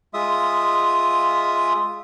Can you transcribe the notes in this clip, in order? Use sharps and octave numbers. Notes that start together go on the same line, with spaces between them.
G#3 F4 E5 D#6